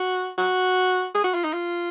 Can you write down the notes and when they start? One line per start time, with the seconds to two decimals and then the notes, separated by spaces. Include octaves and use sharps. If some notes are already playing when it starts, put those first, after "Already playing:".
Already playing: F#4
0.38 F#4
1.15 G#4
1.24 F#4
1.34 F4
1.44 D#4
1.53 F4